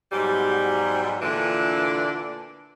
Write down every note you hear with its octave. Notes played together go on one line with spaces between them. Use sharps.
G#2 B2 F#3 G3
A#2 D3 E3 A3 D4